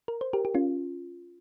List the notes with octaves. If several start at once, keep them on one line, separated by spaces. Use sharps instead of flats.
A#4
C5
G4 A#4
G4
C#4 F4